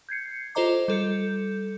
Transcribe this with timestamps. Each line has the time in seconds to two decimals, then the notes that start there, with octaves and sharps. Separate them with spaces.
0.09 G6 G#6 C7 C#7
0.55 F4 A4 C5 D#5 A#5 D6
0.88 G3 A4 G6 C#7